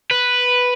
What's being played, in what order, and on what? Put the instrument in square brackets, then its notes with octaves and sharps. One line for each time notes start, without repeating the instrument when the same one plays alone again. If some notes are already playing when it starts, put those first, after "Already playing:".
[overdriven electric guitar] B4